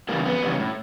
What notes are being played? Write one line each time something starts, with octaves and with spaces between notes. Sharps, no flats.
C#3 E3 G3 A#3
F2 B3
C#3 E3 G3
A2